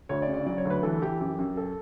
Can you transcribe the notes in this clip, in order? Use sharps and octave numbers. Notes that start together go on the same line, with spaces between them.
D2 C#5
D5
C#3
D5
F#3 D5
C#5
D2
B4
E3 A4
E3 G4
F#2 G4
F#2
A4